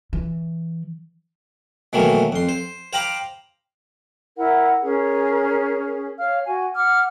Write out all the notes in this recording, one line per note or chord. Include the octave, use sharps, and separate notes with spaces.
E3
B2 D#3 E3 F#3 A3 A#3
F2 C6
C5
C5 F5 G5 A#5 B5 D6
E4 A#4 F#5
C#4 G#4 A#4
C#5 F5 F6
F#4 G#5
F#5 D6 F6